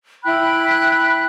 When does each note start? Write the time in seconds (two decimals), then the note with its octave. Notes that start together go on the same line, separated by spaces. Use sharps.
0.23 E4 G5 B5 F#6